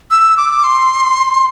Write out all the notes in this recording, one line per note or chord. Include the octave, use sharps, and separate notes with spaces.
E6
D6
C6